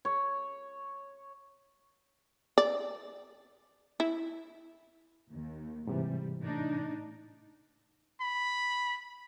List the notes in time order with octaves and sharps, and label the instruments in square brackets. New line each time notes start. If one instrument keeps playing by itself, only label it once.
[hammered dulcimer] C#5
[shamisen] D5
E4
[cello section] D#2
[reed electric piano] G#2 C3 E3 [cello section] G3
[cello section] A2 D4 D#4
[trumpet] B5